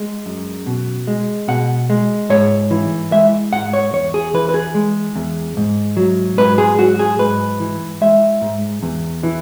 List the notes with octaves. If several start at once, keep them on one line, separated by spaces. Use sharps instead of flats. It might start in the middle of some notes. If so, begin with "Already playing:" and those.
Already playing: G#3
F#2
B2
G#3
B2 F#5
G#3
G#2 C#5
E3
G#3 E5
G#2 F#5
C#5
E2 C#5
G#4
E3 B4
B4
G#4
G#3
E2
G#2
F#3
G#2 B4
G#4
F#3 F#4
G#4
G#2 B4
E3
G#3 E5
G#2
E2
E3